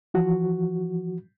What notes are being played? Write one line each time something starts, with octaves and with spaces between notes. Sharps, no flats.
E3 F3 F#4